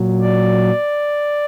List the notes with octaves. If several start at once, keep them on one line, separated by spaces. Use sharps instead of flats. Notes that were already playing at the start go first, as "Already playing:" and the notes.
Already playing: A#2 F#3
D5